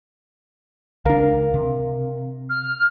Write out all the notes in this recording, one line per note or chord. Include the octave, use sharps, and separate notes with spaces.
C#2 D4 A#4 F5
C3
F6